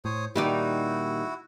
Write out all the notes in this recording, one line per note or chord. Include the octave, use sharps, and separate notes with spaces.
A2 C5 C#5 D#6
A#2 D#3 G3 D#4 E4 F#4 D5